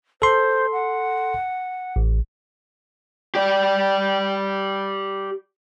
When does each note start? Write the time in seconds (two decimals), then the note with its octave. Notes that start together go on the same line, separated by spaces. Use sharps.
0.22 A4 C5 C6
0.73 F#5
1.96 A1
3.35 G4 D5